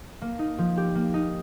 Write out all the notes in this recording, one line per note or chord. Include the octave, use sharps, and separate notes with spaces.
A#3
D#4
F3
G4
A#3
D#4